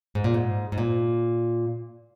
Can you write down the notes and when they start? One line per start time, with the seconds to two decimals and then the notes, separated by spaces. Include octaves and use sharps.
0.15 G#2
0.24 A#2
0.34 G#2
0.72 G#2
0.78 A#2